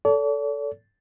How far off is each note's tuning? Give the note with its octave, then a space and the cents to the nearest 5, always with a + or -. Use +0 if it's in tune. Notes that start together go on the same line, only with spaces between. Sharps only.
A4 +0 D5 -45